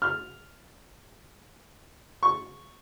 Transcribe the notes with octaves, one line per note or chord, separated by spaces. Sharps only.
F6
C#6